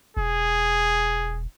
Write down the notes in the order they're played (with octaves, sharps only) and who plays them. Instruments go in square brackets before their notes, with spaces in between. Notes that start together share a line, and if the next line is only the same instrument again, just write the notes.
[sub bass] E1 [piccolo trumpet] G#4